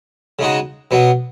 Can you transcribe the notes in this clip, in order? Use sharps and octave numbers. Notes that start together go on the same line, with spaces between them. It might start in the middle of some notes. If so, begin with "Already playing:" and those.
C#3 G#3 D#4 F#4
B2 F#3 B3